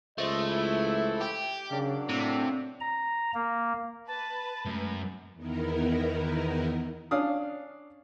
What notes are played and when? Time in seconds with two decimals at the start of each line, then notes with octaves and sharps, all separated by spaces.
0.18 C#2 A3 C5 D#5
0.49 E3 F3 E4
1.21 G4
1.71 C#3 F#3 A#3 D4
2.09 A2 C3
2.80 A#5
3.34 A#3
4.07 B4 A5
4.65 F#2 G#3 A3
5.34 E2 D#3 B3 D#4 E4 A#4
7.11 C#4 D4 F5 D#6